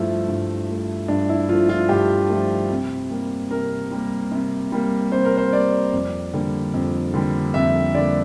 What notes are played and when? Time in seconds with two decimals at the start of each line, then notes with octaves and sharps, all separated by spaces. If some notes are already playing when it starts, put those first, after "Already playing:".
Already playing: G2 F3 A3 E4
0.28 G2
0.68 F3 A3
1.08 G2 D4
1.29 E4
1.49 F3 F4
1.52 A3
1.69 F4
1.89 G2 G4
2.29 F3 A3
2.70 C3
3.11 G3 A#3
3.51 C3 A#4
3.91 G3 A#3
4.32 C3
4.72 G3 A#3
5.12 C3 C5
5.25 A#4
5.37 C5
5.53 G3 A#3 D5
5.93 F2
6.33 D3 G3 A#3
6.74 F2
7.14 D3 G3 A#3
7.54 F2 E5
7.95 D3 G3 A#3 D5